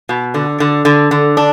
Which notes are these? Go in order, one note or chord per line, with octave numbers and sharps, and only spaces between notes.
B2
D3
D3
D3
D3
D4